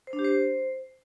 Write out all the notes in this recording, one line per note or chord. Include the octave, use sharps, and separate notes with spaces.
C5
D4
G4
C5